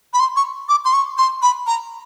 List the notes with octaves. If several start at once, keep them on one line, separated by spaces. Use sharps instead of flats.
B5
C6
C#6
D6
C6
C#6
C6
B5
A#5